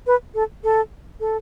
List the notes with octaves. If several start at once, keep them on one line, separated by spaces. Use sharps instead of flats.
B4
A4
A4
A4